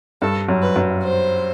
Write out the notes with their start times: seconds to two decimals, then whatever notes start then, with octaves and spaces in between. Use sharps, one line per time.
0.22 G2 A4
0.49 F#2
0.62 B4
0.76 F#2
1.03 C5